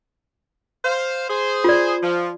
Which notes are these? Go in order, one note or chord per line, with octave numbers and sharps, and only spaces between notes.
C5 F5
G#4 C5
F4 D5
F3